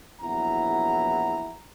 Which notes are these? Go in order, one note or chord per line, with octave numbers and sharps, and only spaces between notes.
A#1 E2 F#3 E4 F#5 A#5